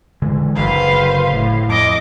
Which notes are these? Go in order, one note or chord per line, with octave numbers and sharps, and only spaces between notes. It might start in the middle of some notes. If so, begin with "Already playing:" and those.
D3 E3 G#3
F#1 D3 B4 C5 F5
A2
F2 D#5 D6